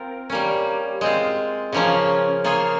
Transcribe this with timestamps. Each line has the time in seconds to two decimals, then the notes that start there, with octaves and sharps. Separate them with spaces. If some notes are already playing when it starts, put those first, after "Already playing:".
Already playing: C4 F4 A#4
0.30 G3 A#3 C#4
1.01 G#3 C4 F4
1.72 C#3 F3 A#3 C#4
2.44 A#3 F4 G#4 C#5